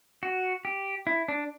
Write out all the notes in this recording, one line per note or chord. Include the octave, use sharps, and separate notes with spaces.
F#4
G4
E4
D4